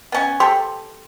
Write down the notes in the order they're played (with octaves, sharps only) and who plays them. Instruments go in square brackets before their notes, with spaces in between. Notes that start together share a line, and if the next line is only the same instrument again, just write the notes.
[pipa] B3 C#4 G#5
[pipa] G4 A4 [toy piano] C6